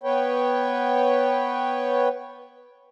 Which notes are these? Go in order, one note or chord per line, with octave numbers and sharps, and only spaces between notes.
B3 B4 C#5 G5